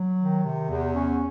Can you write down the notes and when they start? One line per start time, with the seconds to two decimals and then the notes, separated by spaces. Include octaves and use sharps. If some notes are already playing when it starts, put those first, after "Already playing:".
Already playing: F#3
0.20 D#3
0.44 C3
0.69 E2
0.95 C#4